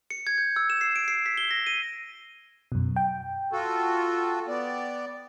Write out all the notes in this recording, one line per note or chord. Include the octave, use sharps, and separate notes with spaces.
C#7
G#6
G6
E6
E7
C7
D7
C7
B6
G7
A#6
D#7
F#2 B2
G5
F4 F#4 A4
B3 D5